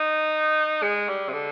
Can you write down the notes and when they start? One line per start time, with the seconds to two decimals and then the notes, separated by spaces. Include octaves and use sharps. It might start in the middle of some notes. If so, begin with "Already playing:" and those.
Already playing: D#4
0.82 G#3
1.08 G3
1.29 C3
1.33 D3